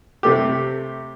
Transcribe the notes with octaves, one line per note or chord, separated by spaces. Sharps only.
C3 A3 G4